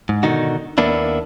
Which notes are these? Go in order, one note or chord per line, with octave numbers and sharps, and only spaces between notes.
G#2
B2 D3 D#3 D#4 F#4
D#2 A#3 B3 D4 E4